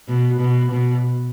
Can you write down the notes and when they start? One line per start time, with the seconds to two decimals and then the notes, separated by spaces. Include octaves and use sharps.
0.08 B2
0.40 B2
0.72 B2